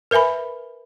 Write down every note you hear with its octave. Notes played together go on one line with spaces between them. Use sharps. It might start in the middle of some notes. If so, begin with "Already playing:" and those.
A#4 B4 E5 G#5 B5